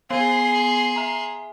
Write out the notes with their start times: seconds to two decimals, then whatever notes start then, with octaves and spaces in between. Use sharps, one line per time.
0.10 B3 G#4 F5 C6 C7
0.96 E5 A#5